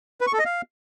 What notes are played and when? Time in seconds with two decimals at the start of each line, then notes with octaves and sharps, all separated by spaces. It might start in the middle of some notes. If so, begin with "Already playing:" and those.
0.21 B4
0.27 C#6
0.33 A4
0.39 D#5
0.45 F5